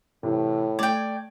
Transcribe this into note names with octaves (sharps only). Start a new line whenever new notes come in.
A2 C3 E3
A3 D5 G5 G#6